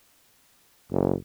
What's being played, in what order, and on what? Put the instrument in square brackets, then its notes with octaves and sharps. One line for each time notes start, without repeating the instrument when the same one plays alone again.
[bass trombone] F#1